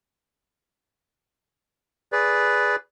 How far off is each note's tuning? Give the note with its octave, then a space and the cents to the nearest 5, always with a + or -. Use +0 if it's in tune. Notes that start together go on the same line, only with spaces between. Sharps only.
G#4 +0 B4 +0 D5 -15